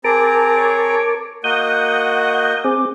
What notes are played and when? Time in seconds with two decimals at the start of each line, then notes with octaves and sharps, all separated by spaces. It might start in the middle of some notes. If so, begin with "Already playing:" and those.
0.04 C4 G#4 A#4 A5 A#5 D6
0.57 C#5
1.44 A#3 F#4 D#5 F#5 D#6 G6
1.65 F#5
2.64 C4 G#4 D6